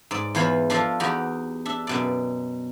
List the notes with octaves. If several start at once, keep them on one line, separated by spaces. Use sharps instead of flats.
G#2 D5
E2 E3 F4 C5 C#5 B5
F3 D4 F4 A4 F5
E2 D#4 F#4 G4 F#5 A#5
D4 E5
F#2 B2 D5